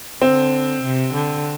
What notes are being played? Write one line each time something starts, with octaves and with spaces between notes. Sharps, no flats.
D3 C4
C3
D3